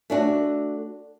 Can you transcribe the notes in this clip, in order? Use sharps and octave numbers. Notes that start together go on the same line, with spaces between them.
A3 D4 F#4